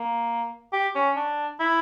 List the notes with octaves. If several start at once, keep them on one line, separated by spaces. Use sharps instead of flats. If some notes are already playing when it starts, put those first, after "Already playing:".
Already playing: A#3
G4
C#4
D4
E4